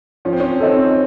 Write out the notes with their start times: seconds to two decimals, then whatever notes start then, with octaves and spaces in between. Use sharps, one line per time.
0.25 F3 C#4
0.33 C4
0.40 C#4
0.60 C4 D#4 A4